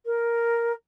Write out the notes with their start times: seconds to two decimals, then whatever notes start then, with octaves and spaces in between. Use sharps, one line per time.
0.05 A#4